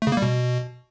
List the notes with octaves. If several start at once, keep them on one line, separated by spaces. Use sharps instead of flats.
A3
C#3
A#3
G3
B2